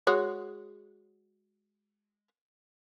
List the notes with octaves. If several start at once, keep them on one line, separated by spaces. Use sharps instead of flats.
G#3 F#4 C#5